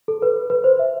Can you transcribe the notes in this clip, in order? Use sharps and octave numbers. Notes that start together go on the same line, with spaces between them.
A4
B4
B4
C5
E5